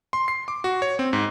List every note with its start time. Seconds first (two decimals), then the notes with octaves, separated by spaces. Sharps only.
0.13 C6
0.28 C7
0.48 D6
0.64 F#4
0.82 C#5
0.99 C4
1.13 G#2